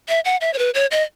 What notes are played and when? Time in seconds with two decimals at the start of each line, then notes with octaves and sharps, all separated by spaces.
0.08 E5
0.25 F#5
0.41 E5
0.54 C#5
0.59 B4
0.75 C#5
0.91 D#5